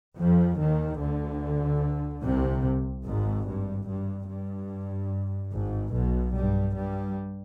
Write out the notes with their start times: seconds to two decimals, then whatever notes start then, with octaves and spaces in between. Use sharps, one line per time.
0.18 F2 F3
0.59 D#2 D#3
1.00 D2 D3
2.23 C2 C3
3.05 G#1 G#2
3.47 G2
3.89 G2
4.29 G2
5.52 G#1 G#2
5.94 B1 B2
6.35 G2 G3
6.76 G2 G3